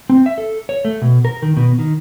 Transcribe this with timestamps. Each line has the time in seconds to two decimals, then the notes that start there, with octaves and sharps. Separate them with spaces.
0.10 C4
0.26 E5
0.38 A4
0.69 C#5
0.85 A3
1.02 B2
1.25 A#4
1.42 D#3
1.57 B2
1.79 D#3